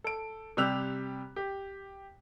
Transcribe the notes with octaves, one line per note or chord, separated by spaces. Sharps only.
A4 D7
C3 G3 G4 E6 F#6 F7
G4